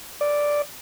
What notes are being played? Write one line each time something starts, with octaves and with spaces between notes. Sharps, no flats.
D5